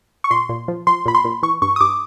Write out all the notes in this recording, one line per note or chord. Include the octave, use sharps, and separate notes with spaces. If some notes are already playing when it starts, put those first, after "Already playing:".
C#6
A#2 C6
A#2
F3
F3 C6
A#2 B5
C6
A#2
E3 C#6
G2 C#6
D#6
G2 D6